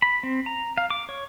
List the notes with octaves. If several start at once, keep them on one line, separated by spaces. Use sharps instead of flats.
B5
C4
A#5
F5
D6
C#5